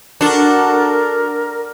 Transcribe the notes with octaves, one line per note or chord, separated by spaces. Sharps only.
D4 F#4 A4 A#4